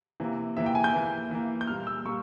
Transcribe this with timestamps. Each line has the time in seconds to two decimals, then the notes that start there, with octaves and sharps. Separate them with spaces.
0.20 C3 E3 A#3
0.57 C3 E3 A#3 E5
0.66 G5
0.75 G#5
0.84 G6
0.93 E3 A#3
1.31 E3 A#3
1.61 G6
1.67 A#2 G3 A#3 F6
1.87 E6
2.05 A#2 G3 A#3 C#6